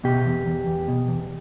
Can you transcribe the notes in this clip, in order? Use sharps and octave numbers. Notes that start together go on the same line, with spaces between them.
B2 G4
E2
E2
E2
B2
E2